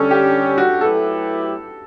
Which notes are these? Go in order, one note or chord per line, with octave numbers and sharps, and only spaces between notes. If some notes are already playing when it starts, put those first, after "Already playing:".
Already playing: D3 G3 C#4 A4
G4
F#4
F#3 A3 E4 G4 A4 B4